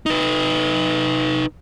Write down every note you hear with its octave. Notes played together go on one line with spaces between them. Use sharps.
D#4 B4